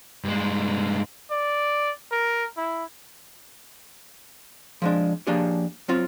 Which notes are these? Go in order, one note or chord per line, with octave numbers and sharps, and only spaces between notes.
G2 G#3
D5
A#4
E4
F3 G#3 D4
F3 A#3 D4 G4 G#4 C#5
F#3 C4 F4